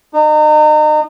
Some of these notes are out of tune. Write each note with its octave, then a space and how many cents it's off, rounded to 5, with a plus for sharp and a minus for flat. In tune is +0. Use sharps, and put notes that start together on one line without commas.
D#4 -35